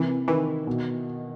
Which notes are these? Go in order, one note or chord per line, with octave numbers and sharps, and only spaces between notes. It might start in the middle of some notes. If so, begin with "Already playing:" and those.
Already playing: C3 E3 A#3
D#3 E3
B2